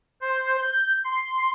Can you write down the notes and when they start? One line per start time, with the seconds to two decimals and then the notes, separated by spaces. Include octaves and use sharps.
0.21 C5
0.58 G6
1.05 C6